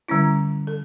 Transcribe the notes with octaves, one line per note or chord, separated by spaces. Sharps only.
D3 G3 C#4 E4
A4